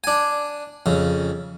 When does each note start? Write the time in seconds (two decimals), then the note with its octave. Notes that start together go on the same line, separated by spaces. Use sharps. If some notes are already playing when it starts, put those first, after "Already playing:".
0.04 D4 G#5
0.86 F2 C#3